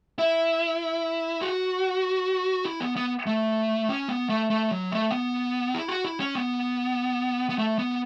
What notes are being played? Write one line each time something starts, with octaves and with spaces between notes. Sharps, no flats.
E4
F#4
E4
B3
B3
A3
C#4
B3
A3
A3
F#3
A3
B3
E4
F#4
E4
C#4
B3
B3
A3
B3